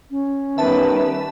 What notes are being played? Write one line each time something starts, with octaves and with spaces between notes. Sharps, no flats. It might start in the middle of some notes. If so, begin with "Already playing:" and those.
C#4
D#3 G3 B3 B4 E5 A5